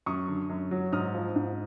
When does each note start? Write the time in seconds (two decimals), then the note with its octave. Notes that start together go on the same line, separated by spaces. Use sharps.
0.06 F#2 C#6 D#6
0.28 D3
0.50 F#2
0.71 F#3
0.92 G#2 D#6 F6
1.14 F3
1.36 G#2